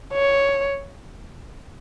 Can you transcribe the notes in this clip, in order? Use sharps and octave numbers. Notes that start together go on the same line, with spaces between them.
C#5